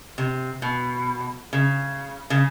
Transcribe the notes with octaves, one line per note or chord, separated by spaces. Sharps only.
C3
B2
C#3
C#3